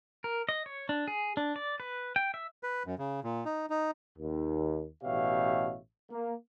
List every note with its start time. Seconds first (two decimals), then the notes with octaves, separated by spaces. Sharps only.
0.24 A#4
0.49 D#5
0.66 C#5
0.89 D4
1.08 G#4
1.37 D4
1.56 D5
1.80 B4
2.16 G5
2.34 E5
2.63 B4
2.86 F#2
2.99 C#3
3.24 A#2
3.45 D#4
3.70 D#4
4.18 D#2
5.03 A1 B2 G4 C#5 E5 F5
6.10 A#3